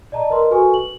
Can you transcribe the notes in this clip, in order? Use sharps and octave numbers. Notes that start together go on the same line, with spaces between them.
D5 D#5 A5 A#5
A#4 B4 D#5 C6
F#4 A4 B4 G#5 C#6
F#7